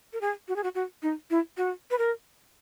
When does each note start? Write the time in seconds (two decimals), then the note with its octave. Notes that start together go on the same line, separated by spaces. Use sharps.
0.13 A#4
0.21 G#4
0.48 F#4
0.56 G#4
0.63 F#4
0.75 F#4
1.03 D#4
1.30 E4
1.57 F#4
1.91 B4
1.98 A#4